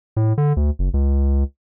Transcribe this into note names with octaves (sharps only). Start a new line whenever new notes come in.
A2
D3
D2
F#1
C#2